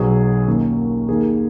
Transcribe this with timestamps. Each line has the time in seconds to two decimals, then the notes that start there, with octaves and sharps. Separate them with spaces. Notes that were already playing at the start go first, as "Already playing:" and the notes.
Already playing: B1 B2 F#3 B3 G#4
0.47 D#2 D#3 A#3 C#4
1.09 D#2 D#3 A#3 G#4